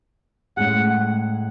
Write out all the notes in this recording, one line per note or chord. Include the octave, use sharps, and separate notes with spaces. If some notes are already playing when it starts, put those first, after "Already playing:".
A2 G#3 C#4 G#4 F#5